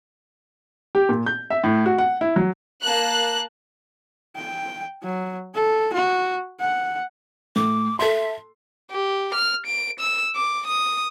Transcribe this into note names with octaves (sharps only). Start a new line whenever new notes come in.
G4
A#2
G6
E5
A2
F#4
F#5
E4
F#3
A#3 A5 F#6
G5
F#3
A4
F#4
F#5
A2 D6
A4 E5 C6
G4
F6
D7
E6
D6
D#6